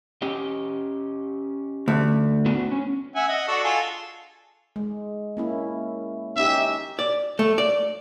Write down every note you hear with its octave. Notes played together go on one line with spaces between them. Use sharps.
C#4 G4 D#5
D2
B3 D4 F#4
C#4
E5 F#5 G#5
D#5 F#5
D4 F#4 A4
F4 G#4 A4
G#3
A#3 C#4 E4
C#4 D#4 G4 E5
D5
A3
D5